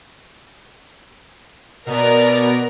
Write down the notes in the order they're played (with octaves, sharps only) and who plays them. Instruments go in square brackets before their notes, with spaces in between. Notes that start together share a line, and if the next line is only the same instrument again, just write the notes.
[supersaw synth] B2 B3 [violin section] A#4 D5 A#5